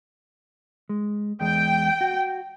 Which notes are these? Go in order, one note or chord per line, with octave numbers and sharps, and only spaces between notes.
G#3
E2 G#3 G5
F#4